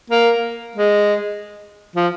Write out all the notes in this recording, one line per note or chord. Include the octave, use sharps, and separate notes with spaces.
A#3
G#3
F3